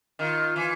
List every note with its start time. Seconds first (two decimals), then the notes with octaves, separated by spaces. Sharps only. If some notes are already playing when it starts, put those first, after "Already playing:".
0.19 D#3 F4
0.56 E3